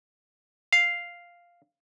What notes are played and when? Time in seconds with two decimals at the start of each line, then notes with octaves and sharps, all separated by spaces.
0.73 F5